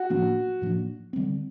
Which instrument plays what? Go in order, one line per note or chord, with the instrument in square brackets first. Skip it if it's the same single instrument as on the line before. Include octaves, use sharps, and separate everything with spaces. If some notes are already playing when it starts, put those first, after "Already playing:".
Already playing: [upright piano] F#4
[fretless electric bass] A2 F3 A#3 D4
A2 F3 A#3 D4
D3 G3 C4